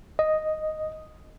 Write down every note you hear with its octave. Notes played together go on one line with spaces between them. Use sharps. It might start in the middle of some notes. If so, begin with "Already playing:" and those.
D#5